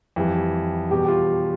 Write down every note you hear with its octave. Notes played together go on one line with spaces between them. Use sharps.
F2 E3 G3
E2 B2 G3 G4
G4
F4